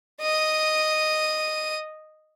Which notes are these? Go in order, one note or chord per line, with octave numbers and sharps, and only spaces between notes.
D#5 D#7